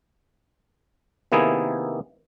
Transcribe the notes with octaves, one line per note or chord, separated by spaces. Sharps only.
C3 D#3 A#3 B3 E4 G#4